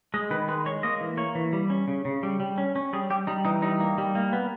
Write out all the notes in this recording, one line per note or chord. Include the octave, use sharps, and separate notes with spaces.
G#3 D#5
D#3 B4
G#3 B4
G#3 C#5
A#3 D#5
E3
A#3 C#5
E3
G3
C#4
C#3
C#3
G3
G3
C#4
C#4
G3 G#4
G3 G4
G3 D#4
E3 D#4
G3 D#4
A#3
G3
A#3
B3